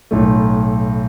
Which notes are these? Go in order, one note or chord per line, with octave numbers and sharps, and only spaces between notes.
B1 A2 A3